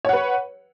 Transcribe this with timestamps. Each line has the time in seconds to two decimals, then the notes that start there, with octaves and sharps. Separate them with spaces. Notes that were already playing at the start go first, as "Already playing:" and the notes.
0.05 C#5
0.09 F#5
0.13 B4